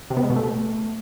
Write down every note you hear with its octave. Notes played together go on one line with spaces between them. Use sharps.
C3
B3
G#3
B2
A3